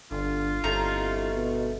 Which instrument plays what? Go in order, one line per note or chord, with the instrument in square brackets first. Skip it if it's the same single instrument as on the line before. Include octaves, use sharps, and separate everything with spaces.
[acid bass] G1 [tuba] D3 [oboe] F4
[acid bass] G1 [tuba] C2 [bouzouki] A3 D#4 A#5
[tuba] B2